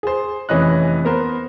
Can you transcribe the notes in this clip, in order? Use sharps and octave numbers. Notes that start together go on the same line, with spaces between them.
G#4 C5
F1 E3 C#4 D#5 F#6
B3 A#4 C5